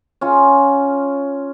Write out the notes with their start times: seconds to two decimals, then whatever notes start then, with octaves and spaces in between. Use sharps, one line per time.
0.21 C#4 F4